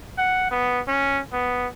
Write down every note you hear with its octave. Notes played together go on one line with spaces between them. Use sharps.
F#5
B3
C#4
B3